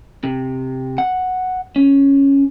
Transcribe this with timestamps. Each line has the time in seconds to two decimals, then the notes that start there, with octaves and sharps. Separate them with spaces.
0.24 C3
0.98 F#5
1.76 C#4